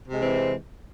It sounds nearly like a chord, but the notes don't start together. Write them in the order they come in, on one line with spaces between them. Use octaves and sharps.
C3 G#3 E3 C4